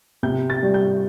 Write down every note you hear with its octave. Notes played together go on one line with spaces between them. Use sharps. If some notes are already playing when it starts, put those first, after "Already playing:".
C3 G6
A6
G3
G6